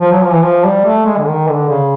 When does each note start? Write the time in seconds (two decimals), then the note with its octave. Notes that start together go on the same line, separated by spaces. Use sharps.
0.01 F3
0.12 F#3
0.22 F3
0.32 E3
0.43 F3
0.64 G3
0.85 A3
1.06 G#3
1.17 D3
1.27 D#3
1.48 D3
1.69 C#3